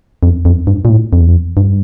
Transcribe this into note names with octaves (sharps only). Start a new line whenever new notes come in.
F2
F2
G2
A#2
A2
F2
E2
F2
G2